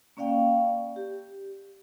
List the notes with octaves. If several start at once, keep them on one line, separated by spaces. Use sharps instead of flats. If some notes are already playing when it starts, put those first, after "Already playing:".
A#3 C#4 D5 F5 G5
G4